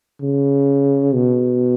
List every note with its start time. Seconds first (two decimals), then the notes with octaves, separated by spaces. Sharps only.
0.22 C#3
1.14 B2